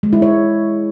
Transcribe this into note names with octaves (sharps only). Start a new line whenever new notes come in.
G#3
E4
C#5